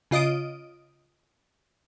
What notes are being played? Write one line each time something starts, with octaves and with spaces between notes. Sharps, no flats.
C#3 F4 D#5 D#6 D7